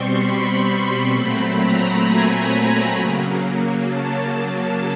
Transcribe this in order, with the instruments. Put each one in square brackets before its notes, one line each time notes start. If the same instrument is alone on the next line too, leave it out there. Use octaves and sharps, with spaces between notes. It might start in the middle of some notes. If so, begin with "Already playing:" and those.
Already playing: [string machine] B2 G3 C4 C6 C#6
B5
A#2 F#3 A3 C4 B5
A#5
G#5
C#3 F#3 A#3
A5